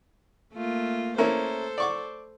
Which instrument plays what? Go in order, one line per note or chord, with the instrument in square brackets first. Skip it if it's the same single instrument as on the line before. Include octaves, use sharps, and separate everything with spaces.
[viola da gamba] A3 A#3 F4
[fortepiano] A#3 C#4 E4 [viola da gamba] A4 C5
[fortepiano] D5 C#6 D6